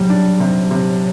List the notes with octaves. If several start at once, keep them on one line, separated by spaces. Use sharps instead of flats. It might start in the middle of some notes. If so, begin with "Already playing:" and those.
Already playing: C3 F#3 G3
D4
C3
C3